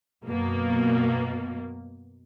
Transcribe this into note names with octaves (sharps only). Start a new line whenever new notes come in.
F#2 B2 A#3